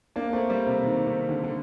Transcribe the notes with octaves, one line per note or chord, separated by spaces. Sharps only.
A#3 D4
A3 C4
G3 A#3
C3
C3 D#3
C3 D#3
D3
D3